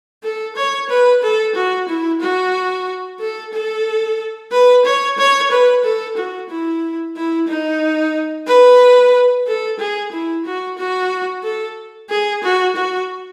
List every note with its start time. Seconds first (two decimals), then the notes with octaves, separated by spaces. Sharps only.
0.23 A4
0.56 C#5
0.89 B4
1.22 A4
1.55 F#4
1.88 E4
2.20 F#4
3.20 A4
3.53 A4
4.52 B4
4.85 C#5
5.18 C#5
5.51 B4
5.84 A4
6.16 F#4
6.49 E4
7.16 E4
7.48 D#4
8.47 B4
9.47 A4
9.79 G#4
10.11 E4
10.45 F#4
10.78 F#4
11.43 A4
12.09 G#4
12.43 F#4
12.75 F#4